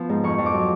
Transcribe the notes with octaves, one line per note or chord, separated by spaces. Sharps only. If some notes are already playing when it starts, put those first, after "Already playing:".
Already playing: F3 B3
G#2
F2 C#6
F2
D6
F#3